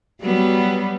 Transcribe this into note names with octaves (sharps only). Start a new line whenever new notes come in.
F#3 G3 B3